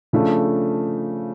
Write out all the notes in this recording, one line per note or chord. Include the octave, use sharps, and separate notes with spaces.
C#3 F3 A3 D4